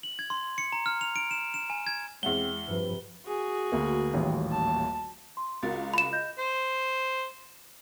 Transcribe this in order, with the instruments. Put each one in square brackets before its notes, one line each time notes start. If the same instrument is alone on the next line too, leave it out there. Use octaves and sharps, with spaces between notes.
[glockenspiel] F#7
G#6
C6
C#7
A#5
F6
F7
D7
E7
E7
G#5
G#6
[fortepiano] E2 E5 F#5 [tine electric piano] G#3 [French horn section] C4 [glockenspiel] G7
[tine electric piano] G2 F3 [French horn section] C3 B4
[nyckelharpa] F#4 G#4
[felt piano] D2 A#3
D#1 A1 D#2
[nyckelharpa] A5
[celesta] C6
[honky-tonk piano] C#2 F#4 A#4 [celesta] A6
[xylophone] B5 E7
[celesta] D#5 G6 A#6
[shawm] C5